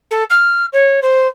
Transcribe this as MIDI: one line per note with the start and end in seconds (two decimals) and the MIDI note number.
0.11 0.23 69
0.30 0.66 89
0.72 1.00 73
1.02 1.27 72